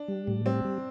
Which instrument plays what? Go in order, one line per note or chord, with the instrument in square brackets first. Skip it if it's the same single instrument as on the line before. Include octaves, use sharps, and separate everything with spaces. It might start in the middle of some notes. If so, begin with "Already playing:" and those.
Already playing: [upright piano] D4
[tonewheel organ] G3
A2
[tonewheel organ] G3 [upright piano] C4
[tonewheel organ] G3